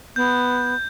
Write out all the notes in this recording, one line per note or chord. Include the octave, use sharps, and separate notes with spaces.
B3 G6